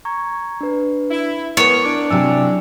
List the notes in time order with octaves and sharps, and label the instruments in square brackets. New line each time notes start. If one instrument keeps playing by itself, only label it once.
[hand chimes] A#5 C#6 G#6
D4 B4
[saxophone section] E4
[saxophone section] G#3 A#3 B3 [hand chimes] E4 [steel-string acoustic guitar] A#4 [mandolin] C#5
[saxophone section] D4 [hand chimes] D6 D7
[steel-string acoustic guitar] C3 F#3 E4 [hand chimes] G#5 E6 A6